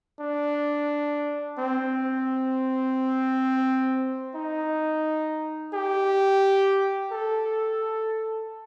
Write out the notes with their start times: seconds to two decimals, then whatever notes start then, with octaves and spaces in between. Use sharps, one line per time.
0.20 D4
1.58 C4
4.35 D#4
5.73 G4
7.11 A4